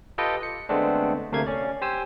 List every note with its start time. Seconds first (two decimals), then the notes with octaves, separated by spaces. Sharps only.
0.18 F4 G4 A4 B4 D#5 G5
0.43 C#7
0.69 D3 G#3 A3 B3 C4 D4
1.32 D2 C3 A3 A#3 F5 G#6
1.46 C#4 D5
1.81 G4 C5 G#5 E6